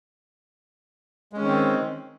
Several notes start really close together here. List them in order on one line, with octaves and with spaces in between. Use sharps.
G#3 C#4 D#3 C4